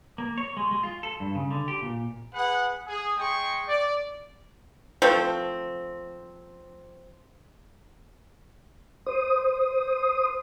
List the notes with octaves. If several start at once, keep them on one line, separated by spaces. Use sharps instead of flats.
A#3
C#5
G#3
G#3
F4
A4
G2
C#3
D3
G4
A#2
G#4 B4 F#5
G#4
G#3 G#4 G5 C#6
D5
F3 A3 C4
C5 D#6